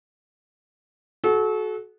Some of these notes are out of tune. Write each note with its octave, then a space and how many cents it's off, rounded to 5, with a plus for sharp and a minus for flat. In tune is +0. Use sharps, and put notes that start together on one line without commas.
F#4 +0 A4 -35